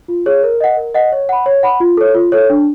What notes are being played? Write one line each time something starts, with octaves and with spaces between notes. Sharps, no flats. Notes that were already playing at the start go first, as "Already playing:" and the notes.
F4
G#4 C#5
A#4
D#5 F#5
A#4
D#5 F#5
C#5
F#5 B5
C#5
F#5 B5
F4
A4 C#5
F4
A4 C#5
D4